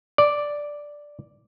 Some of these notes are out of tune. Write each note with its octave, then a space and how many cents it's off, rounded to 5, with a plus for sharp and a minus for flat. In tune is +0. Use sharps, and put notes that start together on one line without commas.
D5 +0